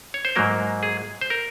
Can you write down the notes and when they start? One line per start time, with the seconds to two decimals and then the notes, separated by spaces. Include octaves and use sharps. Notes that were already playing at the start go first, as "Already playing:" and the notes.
0.14 C#5
0.25 C5
0.36 G#2 F#3 A#3 A#4
0.83 G#4
1.21 C5
1.30 A#4